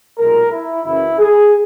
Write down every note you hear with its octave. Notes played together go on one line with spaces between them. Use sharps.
B1 A#2 G#3 A#4
E4
F#1 F#2 E3 A#3 C#4 E4
G#4